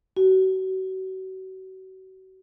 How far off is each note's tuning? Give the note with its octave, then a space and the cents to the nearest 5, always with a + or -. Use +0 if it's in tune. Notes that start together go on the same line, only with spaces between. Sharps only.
F#4 +35